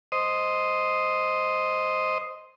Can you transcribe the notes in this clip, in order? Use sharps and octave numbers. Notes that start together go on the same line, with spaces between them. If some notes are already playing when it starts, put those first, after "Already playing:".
C5 D#5